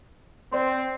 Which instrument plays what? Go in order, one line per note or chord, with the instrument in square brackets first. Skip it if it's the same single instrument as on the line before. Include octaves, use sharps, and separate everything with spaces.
[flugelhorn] C4 [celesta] C5 D5 C6